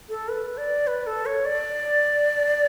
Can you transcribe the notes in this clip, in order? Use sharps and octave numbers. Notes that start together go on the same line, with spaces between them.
A4
B4
D5
B4
A4
C#5
D5